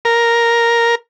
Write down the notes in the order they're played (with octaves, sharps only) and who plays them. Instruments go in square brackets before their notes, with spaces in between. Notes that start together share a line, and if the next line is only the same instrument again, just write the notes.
[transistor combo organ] A#4